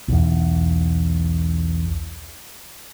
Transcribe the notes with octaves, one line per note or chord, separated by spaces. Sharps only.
B1 E2